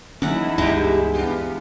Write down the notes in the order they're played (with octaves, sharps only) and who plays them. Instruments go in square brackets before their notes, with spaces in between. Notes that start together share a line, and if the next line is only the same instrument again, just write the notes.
[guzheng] E2 F#5 [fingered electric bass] F#3 A#3 C#4 [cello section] D#4 E4
[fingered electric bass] C#2 G2 [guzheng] G#3 [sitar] D4 G4
[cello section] B3 [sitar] D4 F4 G4